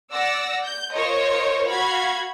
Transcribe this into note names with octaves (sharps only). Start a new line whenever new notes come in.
D5 F#5 E6 A#6
G6
F4 A#4 C5 C#5 D#5
F#4 F5 B5 G#6